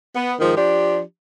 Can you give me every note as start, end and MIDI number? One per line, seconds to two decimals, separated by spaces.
0.15 0.34 59
0.40 0.53 44
0.40 0.53 51
0.40 0.53 53
0.55 1.01 53
0.55 1.01 62
0.55 1.01 67